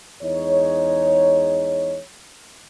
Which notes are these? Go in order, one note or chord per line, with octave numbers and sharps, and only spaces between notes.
E2 G#3 D#4 C#5